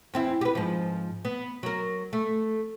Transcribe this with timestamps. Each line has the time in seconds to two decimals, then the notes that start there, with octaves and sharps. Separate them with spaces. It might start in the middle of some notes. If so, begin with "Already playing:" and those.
0.14 E2 C4 E4
0.41 G4 B4
0.55 G#2 F3
1.25 B3
1.63 F#3 A#4
2.13 A3